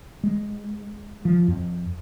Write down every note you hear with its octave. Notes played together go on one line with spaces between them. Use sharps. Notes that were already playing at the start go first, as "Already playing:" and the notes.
G#3
F3
F2